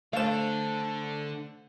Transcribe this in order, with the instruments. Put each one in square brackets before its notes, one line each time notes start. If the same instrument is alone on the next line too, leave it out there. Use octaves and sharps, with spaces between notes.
[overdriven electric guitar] D3 A4 [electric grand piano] A3 E7 [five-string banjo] C5 F5